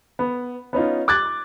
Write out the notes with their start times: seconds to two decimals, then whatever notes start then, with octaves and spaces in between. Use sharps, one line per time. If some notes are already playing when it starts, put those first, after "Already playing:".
0.19 B3
0.73 B3 C#4 D#4 F4
1.08 D6 F#6 G#6 A6